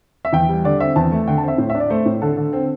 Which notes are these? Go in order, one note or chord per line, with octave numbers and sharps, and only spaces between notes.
E5
E2 G5
G3
D3 D5
C4 E5
E2 A5
A3
D3 G5
A5
C4 E5
A2 C5
E5
D4
D5
A3 C5
A2
D3 A4
D3
C4